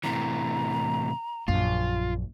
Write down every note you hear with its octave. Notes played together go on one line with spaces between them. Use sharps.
A2 C3 E3 A#5
A#1 F#2 F4